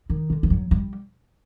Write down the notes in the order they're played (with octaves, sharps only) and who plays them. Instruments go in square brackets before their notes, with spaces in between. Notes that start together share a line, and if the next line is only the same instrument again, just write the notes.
[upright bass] D#3
D3
F3
F#3
G3